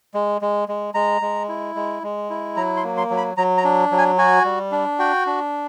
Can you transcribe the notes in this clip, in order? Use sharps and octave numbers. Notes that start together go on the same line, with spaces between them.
G#3
G#3
G#3
G#3 A#5
G#3
E4
G#3
G#3
E4
F#3 A#5
C6
A#3
C6
F#3
B5
F#3 A#5
A#5
D4
F#3
G#5
F#4 G#5
G3
D4
F#4 G5
D4